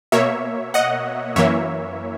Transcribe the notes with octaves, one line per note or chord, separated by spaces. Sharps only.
B2 A#3 C#5 E5
D#5 F#5
F#2 E3 A#3 C#5 E5